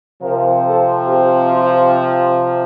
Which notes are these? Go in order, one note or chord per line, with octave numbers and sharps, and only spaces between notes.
C3 F3 C4 A#4
A4
G4
F4